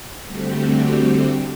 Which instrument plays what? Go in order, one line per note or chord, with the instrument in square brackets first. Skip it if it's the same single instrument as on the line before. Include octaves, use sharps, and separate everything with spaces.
[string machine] D3 G3 A3 C4 F#4 G4